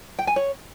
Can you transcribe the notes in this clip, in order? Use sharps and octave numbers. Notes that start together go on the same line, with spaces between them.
G5
G#5
C#5